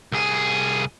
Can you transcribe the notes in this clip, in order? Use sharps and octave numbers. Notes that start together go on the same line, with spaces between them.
C2 G#4